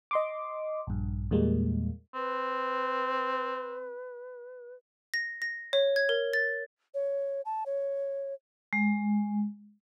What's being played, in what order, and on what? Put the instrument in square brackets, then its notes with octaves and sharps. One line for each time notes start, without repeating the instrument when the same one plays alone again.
[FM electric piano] D#5 C6 D6
A#1 G2
E2 A#2 G3 G#3 A#3
[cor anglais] C4 [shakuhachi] B4
[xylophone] A#6
A#6
C#5
G#6
A#4
A6
[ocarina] C#5
A5
C#5
[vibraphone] G#3